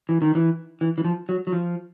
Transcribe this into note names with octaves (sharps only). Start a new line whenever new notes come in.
E3
D#3
E3
E3
E3
F3
F#3
F#3
F3